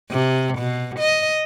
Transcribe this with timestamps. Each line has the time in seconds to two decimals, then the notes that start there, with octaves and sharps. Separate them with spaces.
0.11 C3
0.58 B2
0.99 D#5